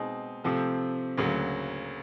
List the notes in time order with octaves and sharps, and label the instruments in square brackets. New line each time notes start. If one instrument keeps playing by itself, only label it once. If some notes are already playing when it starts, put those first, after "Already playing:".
Already playing: [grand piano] B2 G#3 C4 D#4 G#4
C3 F3 A3 C4
D2 C#3 F#3 A#3